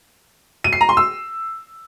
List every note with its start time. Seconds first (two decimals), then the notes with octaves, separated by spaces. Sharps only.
0.64 D#7
0.73 C7
0.81 A#5
0.89 C6
0.97 E6